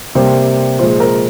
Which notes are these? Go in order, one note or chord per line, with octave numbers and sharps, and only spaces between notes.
C3 G3 A#3 C5
A#2 F3 G#3 C5
A#4